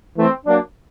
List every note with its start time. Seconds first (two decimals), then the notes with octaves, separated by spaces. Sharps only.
0.15 E3 A3 C4
0.46 F#3 A#3 D4